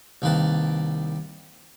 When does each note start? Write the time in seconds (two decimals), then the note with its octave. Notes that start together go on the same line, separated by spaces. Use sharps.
0.22 C2 D#3 A#3 B4 A5